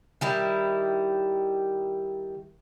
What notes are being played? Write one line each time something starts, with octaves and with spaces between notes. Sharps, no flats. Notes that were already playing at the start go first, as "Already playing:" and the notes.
D#3 G3 E4